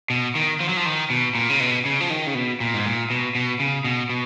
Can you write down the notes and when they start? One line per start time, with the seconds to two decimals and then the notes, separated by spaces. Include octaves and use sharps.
0.10 B2
0.35 D#3
0.60 F3
0.69 F#3
0.77 F3
0.86 D#3
1.10 B2
1.35 A#2
1.50 C#3
1.60 B2
1.85 C#3
2.01 F3
2.10 D#3
2.27 C#3
2.35 B2
2.60 A#2
2.74 G#2
2.85 A#2
3.10 B2
3.35 B2
3.60 C#3
3.85 B2
4.09 B2